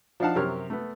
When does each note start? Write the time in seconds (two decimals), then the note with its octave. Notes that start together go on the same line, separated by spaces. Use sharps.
0.20 F3 D4 D#4 F5 F#5 A5
0.35 F#2 C3 G4 A#4 C#5 F6
0.70 A3 B3